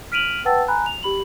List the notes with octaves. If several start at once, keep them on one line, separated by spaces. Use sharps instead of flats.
F6 B6 D7 D#7 F7 F#7
B4 F#5 G5 A5 E6 A6
G#5 A#5 B5 F#6
F7
G4 B5 F#7